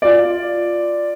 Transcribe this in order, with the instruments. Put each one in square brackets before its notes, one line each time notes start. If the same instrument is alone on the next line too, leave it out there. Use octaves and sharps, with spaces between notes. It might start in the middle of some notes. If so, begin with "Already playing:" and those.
[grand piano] F4 D5